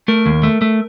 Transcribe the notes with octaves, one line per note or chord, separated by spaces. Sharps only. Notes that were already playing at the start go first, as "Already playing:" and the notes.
A3 A#4
D#2
A3
A3